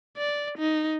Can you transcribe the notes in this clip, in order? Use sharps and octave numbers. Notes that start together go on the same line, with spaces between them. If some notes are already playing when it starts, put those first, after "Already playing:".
D5
D#4